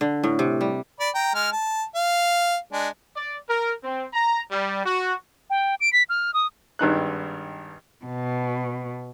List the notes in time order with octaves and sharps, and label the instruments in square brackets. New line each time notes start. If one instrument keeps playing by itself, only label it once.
[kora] D3
A2
C3
G3
[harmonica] D5 B5
G5 A#5
G#3 F6
A5
F5
G#3 D4
[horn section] D5
A#4
C4
A#5
G3
F#4
[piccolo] G5
D7
B6
F6
D#6
[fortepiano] G#1 G2 D#4 F#6
[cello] B2